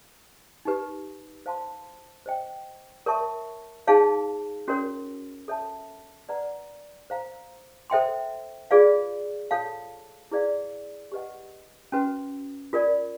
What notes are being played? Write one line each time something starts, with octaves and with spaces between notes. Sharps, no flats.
D#4 G4 B4
C5 F5 A5 C6
C5 D#5 G5
A#4 C#5 E5 A5 C#6
D#4 G#4 C#5 F5 A5
C#4 F#4 A#4 C#5
A4 C#5 E5 A5
B4 D5 F#5 A#5
C5 F5 A#5
A4 C5 E5 G5 C6
F4 G#4 B4 D5 F5
F4 A4 C#5 F5 A5
E4 G#4 B4 D5 F5
G4 B4 D#5 F#5
C#4 F#4 B4
F4 A#4 D5